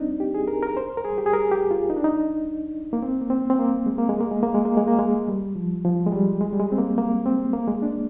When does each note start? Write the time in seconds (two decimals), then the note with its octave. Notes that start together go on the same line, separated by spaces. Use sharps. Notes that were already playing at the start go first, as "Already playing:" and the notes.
Already playing: C4 D4 D#4
0.20 G4
0.34 G#4
0.48 A#4
0.63 A#4
0.77 C5
0.97 A#4
1.05 G#4
1.18 G4
1.26 G#4
1.33 A#4
1.51 G4
1.71 F4
1.90 D#4
1.96 D4
2.04 D#4
2.93 A#3
3.02 C4
3.21 A#3
3.30 C4
3.50 C4
3.59 A#3
3.86 G#3
3.98 A#3
4.09 G#3
4.20 A#3
4.31 G#3
4.43 A#3
4.54 G#3
4.65 A#3
4.77 G#3
4.88 A#3
4.99 G#3
5.28 G3
5.56 F3
5.85 F3
6.07 G#3
6.12 G3
6.41 G#3
6.53 G3
6.59 G#3
6.72 C4
6.78 A#3
6.98 A#3
7.26 C4
7.53 A#3
7.68 G#3
7.82 D4